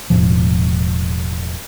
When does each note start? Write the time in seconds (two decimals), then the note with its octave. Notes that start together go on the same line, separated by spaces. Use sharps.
0.10 E1 C#2 A2 F3